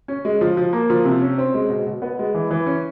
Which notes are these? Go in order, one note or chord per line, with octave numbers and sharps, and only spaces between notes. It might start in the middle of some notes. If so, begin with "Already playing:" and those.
C#4
G#3
F3
F3
A#3
F3
C3
C#4
C4
G#3
B2
B2
B3
G#3
E3
E3
C#4